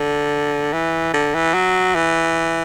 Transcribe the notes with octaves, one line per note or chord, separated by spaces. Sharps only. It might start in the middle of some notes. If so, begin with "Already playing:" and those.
Already playing: D3
E3
D3
E3
F#3
E3